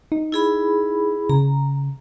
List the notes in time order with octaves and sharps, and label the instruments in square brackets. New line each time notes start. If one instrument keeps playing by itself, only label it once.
[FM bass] D#4
[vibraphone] E4 G#4 B5
[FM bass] C#3 [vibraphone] A#5